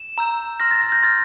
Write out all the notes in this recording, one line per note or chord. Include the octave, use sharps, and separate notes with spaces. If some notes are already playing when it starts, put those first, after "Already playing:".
Already playing: E7
A#5 E6 G6
C6 F6 A#6
A6
A#6
G6
C6 F6 A6